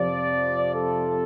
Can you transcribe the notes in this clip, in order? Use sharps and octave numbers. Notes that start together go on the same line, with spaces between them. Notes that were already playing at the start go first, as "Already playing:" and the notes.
Already playing: F2 C3 F3 D5
A4